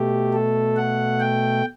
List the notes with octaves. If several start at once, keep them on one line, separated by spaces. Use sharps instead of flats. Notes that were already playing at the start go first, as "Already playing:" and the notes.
Already playing: B2 A3 G4
A4
F#5
G5